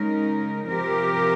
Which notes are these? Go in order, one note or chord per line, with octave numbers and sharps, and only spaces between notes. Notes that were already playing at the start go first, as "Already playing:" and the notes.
Already playing: C#3 G#3 D#4 A#4
C3 F3 C4 G4 A#4